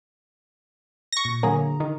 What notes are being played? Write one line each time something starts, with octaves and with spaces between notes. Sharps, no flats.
C#6 A#6
A#2
D3 F#3 A#3 G#4 A#5
D#3